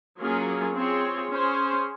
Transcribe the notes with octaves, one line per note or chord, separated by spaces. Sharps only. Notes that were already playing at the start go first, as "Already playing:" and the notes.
F#3 A#3 C#4 F4 G#4
C4 F4 G#4 C#5
C#4 G#4 C5